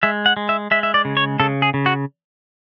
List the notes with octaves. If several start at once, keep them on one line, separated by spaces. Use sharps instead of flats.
G#3 E5
F#5
G#3
E5
G#3 E5
E5
D5
C#3
C#5
C#3 A4
G#4
C#3
F#4